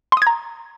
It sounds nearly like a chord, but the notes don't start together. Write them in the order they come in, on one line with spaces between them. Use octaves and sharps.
C6 D#6 G#6 A#5